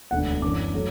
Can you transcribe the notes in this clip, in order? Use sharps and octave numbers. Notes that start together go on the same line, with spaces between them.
E1 D2 D3 F#5
F#2 E3 D4 D6
F#3 A3